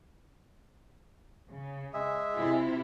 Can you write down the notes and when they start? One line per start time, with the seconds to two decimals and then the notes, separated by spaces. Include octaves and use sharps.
1.49 C#3
1.94 G#3 G#4 E5
2.35 C3 E4 F4